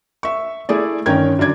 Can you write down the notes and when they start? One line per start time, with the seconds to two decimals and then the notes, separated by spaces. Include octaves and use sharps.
0.23 E5 C#6
0.69 A3 E4 G#4 D5
1.06 G1 D#3 C#4 A#4 G5 G#6
1.39 F#2 D3 D5 G#6